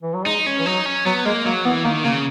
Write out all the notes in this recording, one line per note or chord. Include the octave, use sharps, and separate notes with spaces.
E3
F#3
G#3 D#4
C#4
E3
F#3 D#4
C#4
F#3 B3
G#3 A#3
F#3 A#3
E3 B3
D#3 A#3
C#3 A#3